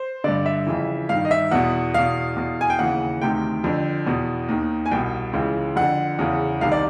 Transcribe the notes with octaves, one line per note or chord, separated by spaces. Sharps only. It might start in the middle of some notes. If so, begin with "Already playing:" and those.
Already playing: C5
G2 D3 D5
E5
F2 C#3 E3
G2 D#3 F5
D#5
E5
E2 B2 F#5
E2 B2 F5
E2 B2
G#5
G5
D#2 C#3 E3 F#5
D2 C3 D#3 G5
F2 D3
E2 B2
D#2 D#3
G#5
C2 B2 G5
C#2 C#3 E3
F2 D3 F#5
E2 C#3 E3
C2 C3 D#3 F5
D5